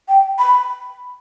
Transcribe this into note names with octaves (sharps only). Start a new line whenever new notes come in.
G5
B5